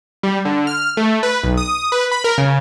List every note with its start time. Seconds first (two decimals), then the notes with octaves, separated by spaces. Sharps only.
0.23 G3
0.45 D3
0.67 F6
0.97 A3
1.23 B4
1.43 B1
1.57 D#6
1.92 B4
2.12 B5
2.24 A#4
2.38 C#3